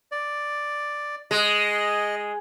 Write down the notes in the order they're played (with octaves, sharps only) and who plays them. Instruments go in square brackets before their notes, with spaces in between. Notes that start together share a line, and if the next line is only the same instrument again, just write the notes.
[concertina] D5
[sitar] G#3 [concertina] D#5